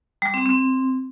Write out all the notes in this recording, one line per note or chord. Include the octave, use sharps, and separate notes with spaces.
G3
C4
C4